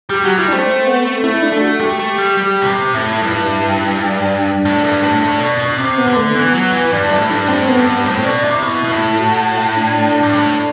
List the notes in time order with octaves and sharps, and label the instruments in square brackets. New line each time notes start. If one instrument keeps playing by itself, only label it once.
[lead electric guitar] G3 [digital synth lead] G4
[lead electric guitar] F#3 [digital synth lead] F#4
[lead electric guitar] G3 [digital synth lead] E4
[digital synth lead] D4
[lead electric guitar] A3 [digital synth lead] C4
[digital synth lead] C4
B3
C4
[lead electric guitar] A3 [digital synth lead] E4
[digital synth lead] D4
[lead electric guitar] A3
[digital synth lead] F#4
[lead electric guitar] A3 [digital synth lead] G4
[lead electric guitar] A3
G3
G3
B2
C3
[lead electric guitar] A2 [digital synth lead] E4
[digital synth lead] E4
[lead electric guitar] G2
[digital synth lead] E4
D4
[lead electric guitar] A2
G2
A2
A2
B2
B2
[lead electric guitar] C3 [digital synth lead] C4
[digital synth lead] B3
[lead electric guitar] D3
[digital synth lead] A3
[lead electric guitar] E3 [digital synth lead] B3
[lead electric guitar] F#3
E3
[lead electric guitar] G2 [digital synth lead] D4
[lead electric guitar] A2 [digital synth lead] E4
[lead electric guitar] G2 [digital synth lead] D4
[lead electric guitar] A2 [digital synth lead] C4
[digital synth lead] B3
[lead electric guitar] G2
[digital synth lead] B3
[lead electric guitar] A2 [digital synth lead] C4
[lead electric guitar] B2 [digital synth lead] D4
[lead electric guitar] C3 [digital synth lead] E4
[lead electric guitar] B2
B2
A2
[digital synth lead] F#4
F#4
E4
D4
[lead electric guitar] G2
A2